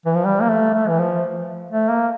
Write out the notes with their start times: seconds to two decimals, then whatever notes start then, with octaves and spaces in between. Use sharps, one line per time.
0.06 E3
0.16 F3
0.25 G3
0.42 A#3
0.49 A3
0.74 A3
0.88 E3
0.99 F3
1.71 A3
1.89 A#3